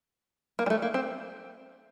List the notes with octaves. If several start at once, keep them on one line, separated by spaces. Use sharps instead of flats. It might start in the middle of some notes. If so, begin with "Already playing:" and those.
A#3
G3
A3
A#3
C4